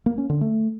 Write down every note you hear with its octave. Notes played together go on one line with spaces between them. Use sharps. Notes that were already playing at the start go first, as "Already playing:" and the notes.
A#3
C#4
D3
A3